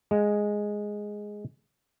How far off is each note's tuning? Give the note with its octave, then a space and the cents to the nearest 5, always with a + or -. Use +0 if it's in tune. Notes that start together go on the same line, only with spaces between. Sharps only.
G#3 +0 F#5 -45